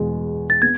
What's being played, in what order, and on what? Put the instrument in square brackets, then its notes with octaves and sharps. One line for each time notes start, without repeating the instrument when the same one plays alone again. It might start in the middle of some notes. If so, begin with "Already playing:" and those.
Already playing: [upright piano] E2 B2 G#3
[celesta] A6
[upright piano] B3 [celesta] G#6